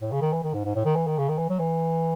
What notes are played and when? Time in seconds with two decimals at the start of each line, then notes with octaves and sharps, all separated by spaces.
0.01 A2
0.12 C#3
0.22 D#3
0.33 E3
0.43 D#3
0.54 G#2
0.65 G#2
0.75 A2
0.85 D#3
0.96 E3
1.07 D#3
1.18 C#3
1.29 D#3
1.38 E3
1.49 F#3
1.59 E3